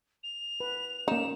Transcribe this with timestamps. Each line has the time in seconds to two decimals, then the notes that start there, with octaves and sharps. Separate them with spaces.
0.23 F7
0.60 B4
1.08 A#3 C#4 D#4 E7